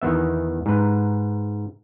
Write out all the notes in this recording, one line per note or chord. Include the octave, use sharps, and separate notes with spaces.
E2 D#3 B3 E5
G#2 B4